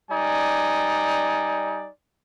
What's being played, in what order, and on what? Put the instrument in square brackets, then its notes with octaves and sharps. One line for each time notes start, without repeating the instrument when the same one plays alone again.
[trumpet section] G3 D#4 D5 G#5